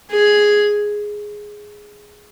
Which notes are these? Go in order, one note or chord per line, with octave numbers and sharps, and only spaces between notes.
G#4